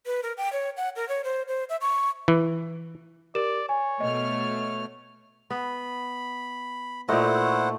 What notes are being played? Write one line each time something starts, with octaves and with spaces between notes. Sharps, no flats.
B4
A#4
G5
C#5
F#5
A#4
C#5
C5
C5
E5
C#6
E3
G4 A#4 D5 E7
C#5 G#5
B2 A3 D#5 F6
B3 B5
A#2 A3 D#4 E4 C5 F#5